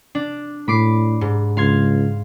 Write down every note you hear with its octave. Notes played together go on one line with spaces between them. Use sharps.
D4
A2 B5 D6 C7
G#2
C#2 F5 C6 G#6